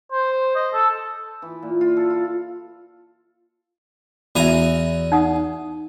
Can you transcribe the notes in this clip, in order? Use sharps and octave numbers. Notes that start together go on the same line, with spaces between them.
C5
D#5
A4
E3
A#2
F4
A4
F4
E2 F#4 E5 G#5 A#5
D#4 F#5 D#6